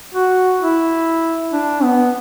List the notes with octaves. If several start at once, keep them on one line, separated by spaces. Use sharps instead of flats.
F#4
E4
D4
B3